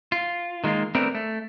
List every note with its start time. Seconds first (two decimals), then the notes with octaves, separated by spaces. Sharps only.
0.12 F4
0.64 D#3 G#3 A#3 F4
0.95 A3 B3 C4 D4 A#4
1.15 A3